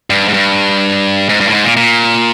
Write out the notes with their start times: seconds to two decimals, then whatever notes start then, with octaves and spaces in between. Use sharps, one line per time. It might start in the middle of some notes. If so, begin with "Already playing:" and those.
0.10 G2
0.28 G#2
0.34 G2
1.29 G#2
1.40 G2
1.47 A2
1.53 G#2
1.64 A#2
1.77 A#2